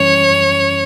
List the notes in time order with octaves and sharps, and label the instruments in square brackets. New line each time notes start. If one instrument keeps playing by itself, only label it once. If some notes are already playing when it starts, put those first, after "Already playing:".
Already playing: [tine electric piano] F#2 E3 G3 C#4 [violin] C#5
[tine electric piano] F#2